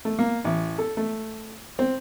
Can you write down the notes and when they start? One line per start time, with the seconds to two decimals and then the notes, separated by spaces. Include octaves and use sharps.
0.05 A3
0.19 A#3
0.44 A1
0.78 A4
0.97 A3
1.79 C4